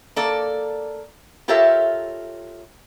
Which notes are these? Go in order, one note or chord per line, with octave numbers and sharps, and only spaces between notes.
A#3 A4 D5
F4 G4 A4 A#4 C#5 E5